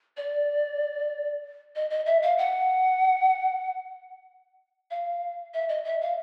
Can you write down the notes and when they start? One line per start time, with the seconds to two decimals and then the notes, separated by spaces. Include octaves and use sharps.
0.17 D5
1.75 D#5
1.90 D#5
2.06 E5
2.22 F5
2.38 F#5
4.91 F5
5.54 E5
5.69 D#5
5.84 E5
6.01 F5